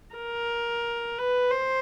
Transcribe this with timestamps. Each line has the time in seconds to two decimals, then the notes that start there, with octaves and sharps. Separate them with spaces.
0.16 A#4
1.18 B4
1.52 C5